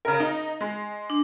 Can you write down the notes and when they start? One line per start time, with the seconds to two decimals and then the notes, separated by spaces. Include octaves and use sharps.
0.05 C#3 A#4
0.20 D#4
0.61 G#3 C6
1.10 D4